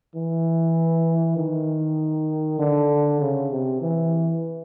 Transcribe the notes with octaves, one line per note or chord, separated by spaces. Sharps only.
E3
D#3
D3
C#3
C3
E3